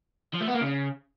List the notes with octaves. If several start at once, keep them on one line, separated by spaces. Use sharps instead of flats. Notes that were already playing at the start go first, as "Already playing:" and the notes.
F3
A3
B3
A#3
C#3